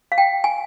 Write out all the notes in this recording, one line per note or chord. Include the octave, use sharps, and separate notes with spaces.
F5
G5
G#5